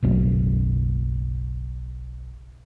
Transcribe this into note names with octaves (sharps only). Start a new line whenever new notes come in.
F#1 B1 F#2